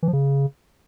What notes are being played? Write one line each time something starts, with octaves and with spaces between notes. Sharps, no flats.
E3
F3
C#3